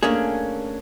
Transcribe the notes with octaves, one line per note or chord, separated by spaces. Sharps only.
A3 A#3 C#4 D4 G#4